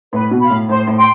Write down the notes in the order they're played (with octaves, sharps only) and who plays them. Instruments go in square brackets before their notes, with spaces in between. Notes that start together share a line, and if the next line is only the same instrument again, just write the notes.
[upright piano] A2 [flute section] B4
[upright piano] B2
[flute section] F5 B5
[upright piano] A2
[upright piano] A2 [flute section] C5
[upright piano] A2
[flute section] G5 C6